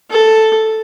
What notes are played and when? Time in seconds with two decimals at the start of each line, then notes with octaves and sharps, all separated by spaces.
0.10 A4